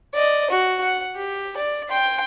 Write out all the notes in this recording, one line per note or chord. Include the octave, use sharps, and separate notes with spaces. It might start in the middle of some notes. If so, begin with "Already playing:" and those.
D5 D#5
F#4
F#5
G4
D5
G5 C6